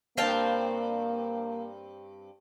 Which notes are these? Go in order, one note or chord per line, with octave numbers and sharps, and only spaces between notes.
G2 A#3 C4 F5 G5 A5